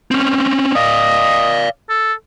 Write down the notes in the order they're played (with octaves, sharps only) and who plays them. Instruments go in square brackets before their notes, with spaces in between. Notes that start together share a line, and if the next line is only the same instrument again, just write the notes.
[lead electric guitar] C4 C#4
[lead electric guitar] D5 F5 [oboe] D#5
[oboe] A4